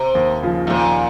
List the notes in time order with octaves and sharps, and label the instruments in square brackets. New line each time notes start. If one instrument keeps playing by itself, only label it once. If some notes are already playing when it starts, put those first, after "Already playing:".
Already playing: [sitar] C3
[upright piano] D#2
C#3 F3
[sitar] G#2
[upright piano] D#2 [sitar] A#2